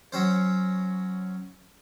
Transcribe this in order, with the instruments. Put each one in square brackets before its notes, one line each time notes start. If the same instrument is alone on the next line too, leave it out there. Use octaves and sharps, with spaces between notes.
[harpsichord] F#3 C#4 C5